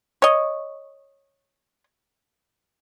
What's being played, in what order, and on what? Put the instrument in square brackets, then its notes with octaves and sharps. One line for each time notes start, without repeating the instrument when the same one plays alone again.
[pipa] C#5 D#5